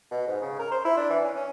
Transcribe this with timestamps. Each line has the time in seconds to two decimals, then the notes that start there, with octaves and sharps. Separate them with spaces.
0.11 B2
0.27 G#2
0.42 C#3
0.59 A#4
0.71 C5
0.85 E4
0.97 D4
1.10 E3
1.24 C#4
1.36 C#4